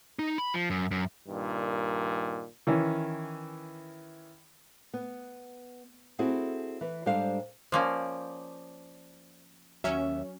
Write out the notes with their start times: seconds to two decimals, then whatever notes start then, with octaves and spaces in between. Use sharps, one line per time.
0.19 D#4
0.38 B5
0.54 F3
0.70 F#2
0.91 F#2
1.27 G2 A#2 D#3
2.67 D#3 E3 C#4
4.94 B3
6.19 C4 E4 F#4 G#4 A4
6.81 E3 B4
7.06 G#2 G3 D4 A4 C5 F5
7.72 F3 A#3 C#4 C5 D5
9.84 D#2 F#3 C#4 E5